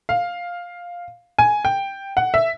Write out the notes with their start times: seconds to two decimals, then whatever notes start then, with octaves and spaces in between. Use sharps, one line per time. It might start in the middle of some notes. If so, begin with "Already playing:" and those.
0.09 F5
1.39 G#5
1.65 G5
2.17 F#5
2.34 E5